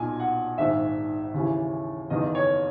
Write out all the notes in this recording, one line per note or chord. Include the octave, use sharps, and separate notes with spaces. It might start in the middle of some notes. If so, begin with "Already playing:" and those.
Already playing: B1 A#2 G#5
F#5
A#1 G#2 D#3 E5
D#2 C#3 E3
F#1 E2 D#3 D#5
C#5